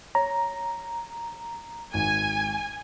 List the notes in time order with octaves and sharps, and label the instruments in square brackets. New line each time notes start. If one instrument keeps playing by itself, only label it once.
[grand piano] C#5 [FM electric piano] A#5
[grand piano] G#1 [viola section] G#5